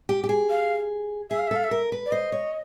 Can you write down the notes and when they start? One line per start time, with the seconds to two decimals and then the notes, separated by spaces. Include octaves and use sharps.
0.09 G4
0.24 G4
0.29 G#4
0.50 F5
1.30 G#4 E5
1.39 F5
1.47 E5
1.51 A4 F5
1.64 E5
1.71 A#4
1.92 B4
2.06 D5
2.11 C5 D#5
2.32 C#5